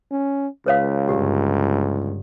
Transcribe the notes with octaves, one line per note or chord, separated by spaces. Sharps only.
C#4
C#2 B4 C#5 F5
G1 G4